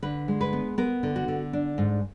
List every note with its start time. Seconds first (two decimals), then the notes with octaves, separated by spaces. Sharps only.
0.03 D3 B4
0.28 G#3
0.41 B4
0.53 B3
0.78 B3 A#4
1.03 D3
1.16 F#4
1.28 D3
1.53 D4
1.78 G#2